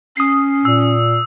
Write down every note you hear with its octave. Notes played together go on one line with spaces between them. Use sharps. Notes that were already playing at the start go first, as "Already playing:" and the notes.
C#4 D#6 C7
A#2 E6